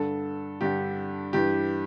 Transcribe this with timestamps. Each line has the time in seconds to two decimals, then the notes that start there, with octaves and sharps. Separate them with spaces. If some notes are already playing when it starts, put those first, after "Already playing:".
Already playing: G2 D3 A4
0.61 G2 D3 G4
1.33 G2 E3 G4